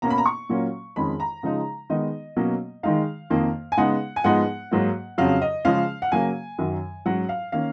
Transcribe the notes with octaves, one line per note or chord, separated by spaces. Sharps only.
B2 A#3 C#4 A#5
B5
A#5
C#6
A#2 F#3 A#3 C#4
F2 D#3 G#3 C#4 B5
A#5
C#3 F3 G#3 D#4
D#3 G#3 B3 D#4 D#5
B2 F#3 A#3 C#4
D#3 G#3 D#4 F5
F2 D#3 A#3
G#5
C#3 G#3 B3 D#4 F#5
G#5
G#2 F3 G#3 B3 D#4 F#5
G#2 F#3 A#3
F2 C#3 F#3 F5
D#5
C#3 F3 G#3 C#4 F5
F#5
C#3 F#3 A#3 G#5
F#2 D#3 F#3
G#2 F#3 C#4 F#5
F5
D#3 A#3 C#4 F5